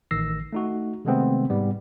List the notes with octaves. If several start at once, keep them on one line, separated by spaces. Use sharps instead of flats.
A1 D#3 E6 A#6 C7
A3 D#4 F#4
C3 D#3 G#3 A3 B3 C4
G#2 G3 B3